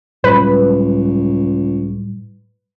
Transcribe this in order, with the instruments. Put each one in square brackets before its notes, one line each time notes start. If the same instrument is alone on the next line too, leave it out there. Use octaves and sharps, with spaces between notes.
[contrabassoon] C#2 [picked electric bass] A2 F#3 G3 [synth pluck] B4